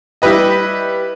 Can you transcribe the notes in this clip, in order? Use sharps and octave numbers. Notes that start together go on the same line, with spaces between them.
G3 E4 G4 B4 D#5